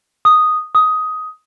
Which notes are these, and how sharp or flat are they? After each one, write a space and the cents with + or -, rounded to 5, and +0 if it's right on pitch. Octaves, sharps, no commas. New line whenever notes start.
D#6 -5
D#6 +10